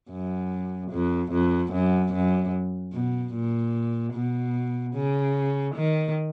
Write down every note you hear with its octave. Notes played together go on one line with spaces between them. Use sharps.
F#2
F2
F2
F#2
F#2
B2
A#2
B2
C#3
D#3